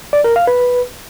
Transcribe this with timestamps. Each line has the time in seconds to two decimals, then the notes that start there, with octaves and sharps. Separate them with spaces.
0.13 D5
0.24 A#4
0.36 F5
0.47 B4